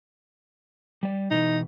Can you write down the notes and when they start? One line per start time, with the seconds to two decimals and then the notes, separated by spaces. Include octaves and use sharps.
1.03 G3 D5
1.31 B2 E3 D#4